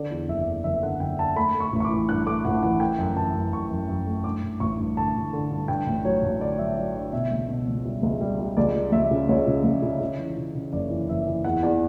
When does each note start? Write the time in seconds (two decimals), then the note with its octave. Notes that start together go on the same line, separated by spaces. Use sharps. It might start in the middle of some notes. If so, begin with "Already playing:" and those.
Already playing: D3 D5
0.11 E2
0.28 F#1 E5
0.47 D3
0.64 F#1 E5
0.82 D3 F#5
1.00 F#1 G5
1.18 D3 A5
1.36 A3 B5
1.54 A3
1.60 C#6
1.73 A1
1.80 C#6
1.85 D6
1.90 E3
2.09 G2 F#6
2.26 A3 D6
2.45 A1 F#5
2.63 E3 F#5
2.80 A3 G5
2.98 F#2
3.16 E3 A5
3.34 F#2
3.53 F#2 C#6
3.71 F#2
3.88 F#2
4.07 A3
4.24 G2 D6
4.43 G2
4.60 A1 C#6
4.78 G2
4.97 D3 A5
5.14 A1
5.33 D3
5.51 G2
5.68 G2 G5
5.87 A1
6.04 F#3 C#5
6.23 A1
6.41 D3 D5
6.58 F#3 E5
6.76 F#3 D5
6.94 D3 D5
7.12 B2 E5
7.31 C#2
7.49 B2
7.67 C#2
7.85 G3
8.03 C#2
8.21 G3
8.39 G3
8.57 C#2 D5
8.75 G3
8.92 C#2 E5
9.11 C#3
9.29 C#2 C#5
9.47 C#3
9.64 C#2
9.83 C#3
10.01 C#3
10.19 E3
10.37 C#3
10.55 C#3
10.73 F#1 D5
10.90 E3
11.08 F#1 E5
11.26 E3
11.44 E2 F#5
11.63 E2 D5